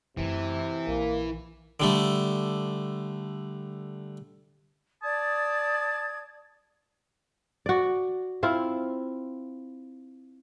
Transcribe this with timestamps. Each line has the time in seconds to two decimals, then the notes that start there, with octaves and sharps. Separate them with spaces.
0.17 F#2 C3 E3 A3
0.87 A#1 A#3
1.80 D3 G3 A3
5.03 D5 A5 D#6 G#6
7.66 F#4 D5
8.43 C4 E4 F4